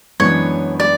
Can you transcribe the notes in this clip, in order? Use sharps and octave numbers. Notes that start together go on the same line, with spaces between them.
F#2 E3 G#3 B3 D4 C#5
D5